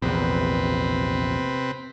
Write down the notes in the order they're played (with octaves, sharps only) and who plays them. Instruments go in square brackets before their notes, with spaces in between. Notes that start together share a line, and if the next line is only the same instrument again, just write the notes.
[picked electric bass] A#1 E2 [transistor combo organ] C3 C4 B4